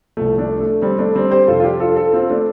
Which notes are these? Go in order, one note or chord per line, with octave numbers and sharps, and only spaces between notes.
C2 C3 F3 A3
A3 D4
A3
G3 C4
A3 D4
G3 C4
G4 C5
F2 C3 F3 F4 A4
F4
D4 G4
F4 A4
F4 A4
C4 F4
A3 D4